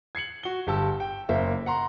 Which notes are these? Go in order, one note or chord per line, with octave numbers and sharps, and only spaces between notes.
G#6 C7 C#7 F#7
F#4 G7
G1 G4 A5 E6
G5
F#1 A#3 C5 E5
F#5 A#5 C6